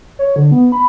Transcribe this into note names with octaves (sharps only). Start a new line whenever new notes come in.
C#5
D3
B3
B5